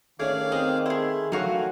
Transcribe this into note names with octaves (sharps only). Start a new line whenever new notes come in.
D#3 A3 C#4 G#4 D5 F5 D6
C4 G#4 D#5
A3 E4 G#4 C6
D#3 F#3 A3 F#4 A#4 F5 G#5 C#6